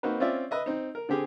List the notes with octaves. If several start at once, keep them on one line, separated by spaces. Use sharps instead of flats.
A#3 C4 D#4 F#4 B4
C4 C#4 F4 D5 E5
B4 D#5 E5
C4 D#4
A#4
D3 C4 G4 G#4